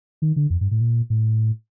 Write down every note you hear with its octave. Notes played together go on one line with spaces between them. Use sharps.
D#3
D3
F2
G2
A2
A#2
A2